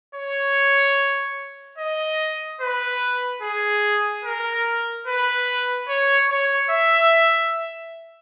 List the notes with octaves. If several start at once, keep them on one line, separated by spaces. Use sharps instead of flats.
C#5
D#5
B4
G#4
A#4
B4
C#5
C#5
E5